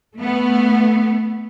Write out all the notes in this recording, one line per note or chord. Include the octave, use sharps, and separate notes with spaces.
A3 B3